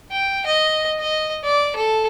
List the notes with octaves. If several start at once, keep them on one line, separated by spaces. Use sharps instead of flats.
G5
D#5
D#5
D5
A4